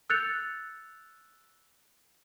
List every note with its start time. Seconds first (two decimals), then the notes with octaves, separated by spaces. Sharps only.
0.10 E6 F#6 G6 A6 C#7 F7